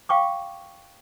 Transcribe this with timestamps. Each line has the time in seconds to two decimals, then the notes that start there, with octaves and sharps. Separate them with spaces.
0.09 F5 G5 C#6 D6